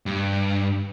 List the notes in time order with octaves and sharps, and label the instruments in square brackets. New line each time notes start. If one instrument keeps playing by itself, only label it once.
[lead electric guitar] G2